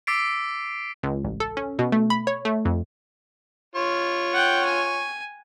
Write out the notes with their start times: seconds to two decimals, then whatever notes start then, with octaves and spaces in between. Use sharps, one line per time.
0.07 D6 E6 A6 B6 C7 D7
1.03 C#2
1.25 A1
1.40 A4
1.57 C#4
1.79 B2
1.92 A3
2.10 B5
2.27 C#5
2.45 A3
2.65 F2
3.76 F4 C#5 C#6
4.34 F#5 G5
4.65 G#5